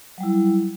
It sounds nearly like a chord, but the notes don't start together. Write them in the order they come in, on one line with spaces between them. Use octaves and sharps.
F#3 G3 E4